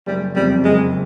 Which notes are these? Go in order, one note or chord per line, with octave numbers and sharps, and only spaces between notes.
F#1 G3
F2 C3 G3
F#1 G#3